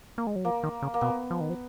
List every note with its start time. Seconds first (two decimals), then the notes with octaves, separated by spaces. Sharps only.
0.18 A#3
0.27 G#3
0.36 F#3
0.45 F3 A#3
0.63 D#3
0.82 C#3
0.94 A#3
1.01 B2 B3
1.31 F3
1.41 D#3
1.50 F3